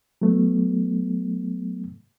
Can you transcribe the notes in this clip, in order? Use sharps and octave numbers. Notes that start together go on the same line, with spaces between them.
F#3 A3 B3